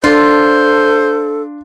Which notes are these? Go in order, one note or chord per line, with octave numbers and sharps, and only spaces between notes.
D4 F4 A4 C5